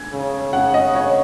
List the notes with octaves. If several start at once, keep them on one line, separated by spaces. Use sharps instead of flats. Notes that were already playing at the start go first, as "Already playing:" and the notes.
Already playing: G#6
C#3
C#3 F#5
D#5
C#5